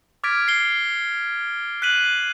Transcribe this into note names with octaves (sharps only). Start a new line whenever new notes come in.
D6 F6 G#6 A6 B6 D7
C7 G7
F#6 B6 D#7 F#7